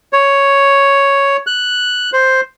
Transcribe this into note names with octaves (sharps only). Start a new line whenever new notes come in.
C#5
F#6
C5